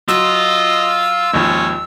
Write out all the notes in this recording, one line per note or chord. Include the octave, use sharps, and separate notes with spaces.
F#3 F4 D#5 E6
G#1 D#2 F3 C#4